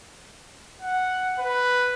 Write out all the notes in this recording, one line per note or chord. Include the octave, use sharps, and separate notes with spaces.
F#5
B4